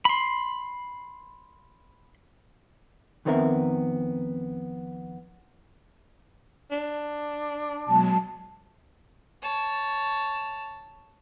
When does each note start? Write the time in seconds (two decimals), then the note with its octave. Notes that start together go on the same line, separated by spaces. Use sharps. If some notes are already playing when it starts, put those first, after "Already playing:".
0.05 B5 C6
3.25 F2 D#3 B3 C4 A#4 E5
6.71 D4
7.86 B2 F#3 G#3 A5
9.42 C#5 A5